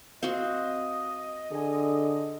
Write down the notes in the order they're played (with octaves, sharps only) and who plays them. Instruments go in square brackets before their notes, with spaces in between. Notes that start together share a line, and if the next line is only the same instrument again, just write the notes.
[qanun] C4 F#4 [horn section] D#5 [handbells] F5
[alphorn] D3 [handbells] G#4 G#5